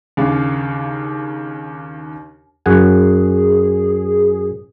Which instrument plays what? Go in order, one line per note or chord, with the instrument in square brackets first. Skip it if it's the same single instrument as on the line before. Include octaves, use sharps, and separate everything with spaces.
[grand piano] D#2 C#3 D4 F5
[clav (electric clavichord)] F#2 F#5 G#5 [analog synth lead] G#4